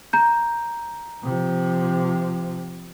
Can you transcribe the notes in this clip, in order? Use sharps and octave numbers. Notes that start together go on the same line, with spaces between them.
A#5 G6
C3 F3